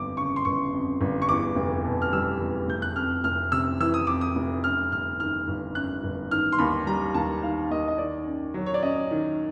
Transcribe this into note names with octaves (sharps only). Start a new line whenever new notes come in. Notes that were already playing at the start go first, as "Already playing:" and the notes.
Already playing: G1 F2 D6
C#3 C#6
C6
G1 C#6
F2
G1
C#6
E2 D6
F1
B2
F6
G3 E6
E2
F1 G6
F#6
F2 F6
F1 F6
C3 E6
E3 E6
D#6
F2 D6
D#6
F1
F#2 F6
G1 F6
D#3 F6
G1
F#2 F#6
G1
D#3 F6
C6
D#2 B5
G3 A#5
D#2 A5
D#3 F5
D#2 D#5
D#5
D#3 D5
F#2
F#3
C#5
D5
F#2 D#5
D#3